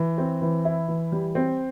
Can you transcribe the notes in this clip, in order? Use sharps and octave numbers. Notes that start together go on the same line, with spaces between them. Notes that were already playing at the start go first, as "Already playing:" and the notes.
Already playing: E3
C4
E3
E4
E3
G3
C4